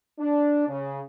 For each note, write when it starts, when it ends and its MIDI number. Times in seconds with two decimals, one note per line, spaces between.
0.19 0.66 62
0.68 1.01 49